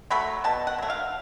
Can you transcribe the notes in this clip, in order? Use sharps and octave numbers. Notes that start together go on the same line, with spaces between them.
F#3 A3 B5
B2 A5
F#5
F#3 A3
F5